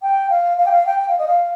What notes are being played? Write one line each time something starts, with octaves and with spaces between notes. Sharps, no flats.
G5
F5
F5
G5
F5
G5
G5
F5
D#5
F5